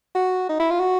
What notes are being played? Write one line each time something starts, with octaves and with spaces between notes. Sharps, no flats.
F#4
D#4
E4
F4
F#4